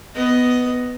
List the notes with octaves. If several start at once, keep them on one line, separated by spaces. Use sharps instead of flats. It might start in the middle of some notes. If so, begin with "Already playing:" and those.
B3 D#5